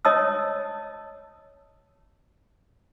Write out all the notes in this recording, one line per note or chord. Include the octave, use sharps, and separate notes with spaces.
C#5 D#5 A5 D#6 E6